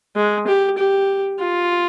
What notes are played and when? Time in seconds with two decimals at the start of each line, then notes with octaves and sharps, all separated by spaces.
0.16 G#3
0.47 G4
0.78 G4
1.39 F4